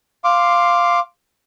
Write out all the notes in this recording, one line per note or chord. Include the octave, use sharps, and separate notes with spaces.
F5 C6 D6